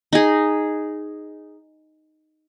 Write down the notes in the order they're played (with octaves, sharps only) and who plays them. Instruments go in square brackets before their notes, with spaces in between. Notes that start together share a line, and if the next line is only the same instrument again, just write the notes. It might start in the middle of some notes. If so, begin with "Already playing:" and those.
[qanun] D#4 G#4